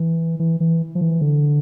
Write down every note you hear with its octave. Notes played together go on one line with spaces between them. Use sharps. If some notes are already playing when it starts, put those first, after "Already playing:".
Already playing: E3
E3
E3
F3
E3
D3